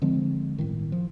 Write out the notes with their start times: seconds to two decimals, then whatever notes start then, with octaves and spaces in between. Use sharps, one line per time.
0.02 D3 F3 G#3 C4
0.58 G1 A2 D#3
0.92 F3